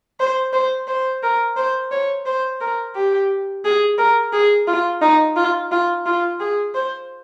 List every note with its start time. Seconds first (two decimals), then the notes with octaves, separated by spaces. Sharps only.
0.20 C5
0.53 C5
0.88 C5
1.23 A#4
1.57 C5
1.92 C#5
2.26 C5
2.61 A#4
2.96 G4
3.65 G#4
3.98 A#4
4.33 G#4
4.67 F4
5.02 D#4
5.36 F4
5.72 F4
6.06 F4
6.40 G#4
6.74 C5